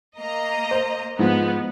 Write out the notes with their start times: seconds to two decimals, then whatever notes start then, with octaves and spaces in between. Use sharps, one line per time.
0.18 A#3 D#5 A#5
0.71 C5
1.19 G#2 F3 G#3 B3